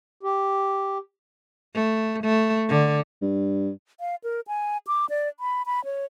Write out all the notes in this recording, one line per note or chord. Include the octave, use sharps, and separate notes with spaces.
G4
A3
A3
D3
G2
F5
A#4
G#5
D6
D5
B5
B5
C#5